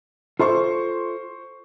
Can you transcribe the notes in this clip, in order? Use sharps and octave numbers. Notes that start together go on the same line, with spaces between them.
F4 A4 C5 E5 C6 C#6